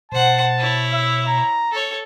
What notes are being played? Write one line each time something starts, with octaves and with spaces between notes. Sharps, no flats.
B2 C5 F#5 A5
E4 C#5
E5
A#5
A4 C#5